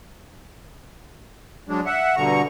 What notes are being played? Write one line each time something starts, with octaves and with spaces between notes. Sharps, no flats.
F#3 G#3 D4
E5 F#5
G2 B2 D3 A#5 C#6